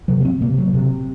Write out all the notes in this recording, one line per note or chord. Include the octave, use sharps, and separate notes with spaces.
C3 F#3
A#3
C4
C3 A#3
F#3
C3